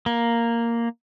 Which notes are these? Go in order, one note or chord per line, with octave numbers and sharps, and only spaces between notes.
A#3